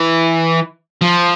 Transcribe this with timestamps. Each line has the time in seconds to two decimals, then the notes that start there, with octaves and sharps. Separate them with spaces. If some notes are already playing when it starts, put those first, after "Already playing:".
Already playing: E3
1.02 F3